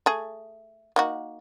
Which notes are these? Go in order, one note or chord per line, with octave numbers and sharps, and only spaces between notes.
A3 G#4
A#3 D#4 F#4